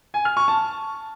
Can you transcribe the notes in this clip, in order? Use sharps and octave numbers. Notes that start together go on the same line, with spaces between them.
G#5
F6
C#6
A5